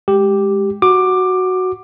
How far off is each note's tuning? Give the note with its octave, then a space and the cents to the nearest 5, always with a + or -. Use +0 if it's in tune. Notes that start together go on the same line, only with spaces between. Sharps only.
G#3 +0 G4 +0
F#4 +0 D6 +15